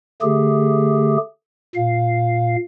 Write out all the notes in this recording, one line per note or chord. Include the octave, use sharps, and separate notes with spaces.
D3 A3 G4 G#4
A#2 F5